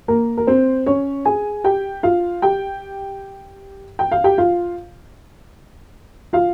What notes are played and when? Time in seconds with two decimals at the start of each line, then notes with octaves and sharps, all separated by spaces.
0.08 A#3 A#4
0.38 A#4
0.47 C4 C5
0.86 C#4 C#5
1.25 G#4 G#5
1.64 G4 G5
2.03 F4 F5
2.42 G4 G5
3.99 G5
4.11 F5
4.24 G4 G5
4.38 F4 F5
6.33 F4 F5